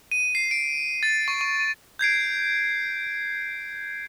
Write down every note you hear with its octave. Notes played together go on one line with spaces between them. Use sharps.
D#7
C7
D7
A6
C#6
C#6
G6 G#6 C7 D7